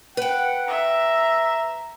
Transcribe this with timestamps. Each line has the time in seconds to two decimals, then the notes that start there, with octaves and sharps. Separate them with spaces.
0.17 B4 F#5 G5
0.68 E5 A#5